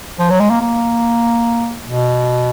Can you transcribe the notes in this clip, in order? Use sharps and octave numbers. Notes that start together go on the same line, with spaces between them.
F3
F#3
G#3
A#3
A#3
B2